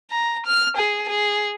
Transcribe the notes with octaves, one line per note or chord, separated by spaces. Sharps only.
A#5
F6
G#4
G#4